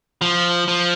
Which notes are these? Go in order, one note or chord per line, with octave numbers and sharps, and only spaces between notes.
F3
F3